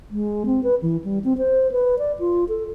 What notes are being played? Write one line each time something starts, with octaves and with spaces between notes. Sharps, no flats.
G#3
C4
B4
E3
G3
C4
C5
B4
D5
F4
A4